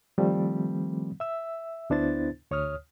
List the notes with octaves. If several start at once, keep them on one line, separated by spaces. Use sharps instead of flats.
D#3 F3 G3 A3 C4
E5 E6
D2 B3 D4 E4 C5 A6
D2 C#5 D#6 F6